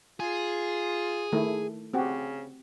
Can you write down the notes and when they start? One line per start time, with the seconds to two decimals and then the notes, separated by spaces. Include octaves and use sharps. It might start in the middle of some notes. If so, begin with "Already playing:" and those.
0.20 F4 G#4
1.32 D#3 A3 E4
1.94 C#3 C4 F#4 G4